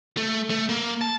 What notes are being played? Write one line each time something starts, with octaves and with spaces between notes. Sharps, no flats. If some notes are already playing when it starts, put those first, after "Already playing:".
A3
A3
A#3
A5